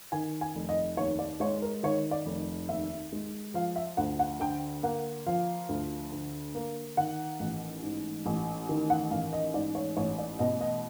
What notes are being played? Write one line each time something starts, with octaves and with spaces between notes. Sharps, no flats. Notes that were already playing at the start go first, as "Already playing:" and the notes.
D#3 G#5
G#5
F1
D#5
D#2 C#5
D5
G#3 C#5
A#4
D#3 C#5
D5
F1
D#2 E5
G#3
F3 F5
E5
D2 F#5
F#5
D3 G5
A#3 F#5
F3 F5
D2
D3
A#3
D#3 F#5
A1
G#2
A1
D#3
F#5
A1 F5
D#5
G#2 D5
C#5
A1 C#5
D5
B2 D#5
D#5